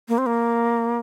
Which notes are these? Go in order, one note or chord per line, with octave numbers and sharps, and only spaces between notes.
A#3
C4
A#3